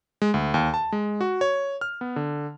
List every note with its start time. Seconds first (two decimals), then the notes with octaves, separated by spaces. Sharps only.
0.22 G#3
0.34 D2
0.54 D#2
0.74 A5
0.92 G#3
1.21 F#4
1.41 C#5
1.81 F6
2.01 B3
2.16 D3